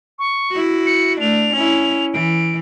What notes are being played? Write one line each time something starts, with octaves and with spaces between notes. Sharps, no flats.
C#6
E4 F#4
C#7
A3 D4 F7
C#4 E4
E3 D7